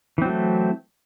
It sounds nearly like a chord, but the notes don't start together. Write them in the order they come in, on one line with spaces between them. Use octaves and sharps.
E3 C4 F#3 A3